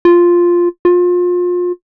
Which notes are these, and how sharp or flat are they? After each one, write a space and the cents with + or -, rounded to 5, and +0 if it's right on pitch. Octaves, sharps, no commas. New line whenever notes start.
F4 +0
F4 +30